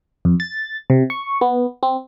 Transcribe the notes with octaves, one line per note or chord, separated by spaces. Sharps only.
F2
A6
C3
C#6
B3
C4